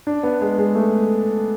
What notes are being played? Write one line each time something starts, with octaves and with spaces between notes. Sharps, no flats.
D4
B3
G#3
G#3
A3